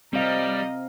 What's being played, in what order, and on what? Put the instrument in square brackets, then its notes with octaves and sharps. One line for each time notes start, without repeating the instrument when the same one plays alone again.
[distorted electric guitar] G3 [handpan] C4 F5 [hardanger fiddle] A#4 D#5